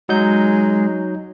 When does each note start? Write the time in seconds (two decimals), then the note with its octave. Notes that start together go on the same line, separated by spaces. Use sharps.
0.09 F#3 G#3 D#4 G6